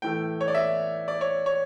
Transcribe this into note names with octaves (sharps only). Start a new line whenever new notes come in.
A2 E3 A3 G5
C#5
D5
E5
D5
C#5
C#5